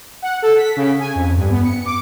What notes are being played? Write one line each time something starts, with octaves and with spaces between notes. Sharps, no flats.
F#5
A4
B6
C#3
G#5
F2
G2
B3
C#7
D6